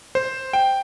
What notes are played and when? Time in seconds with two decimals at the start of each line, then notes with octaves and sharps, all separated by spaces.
0.15 C5
0.53 G5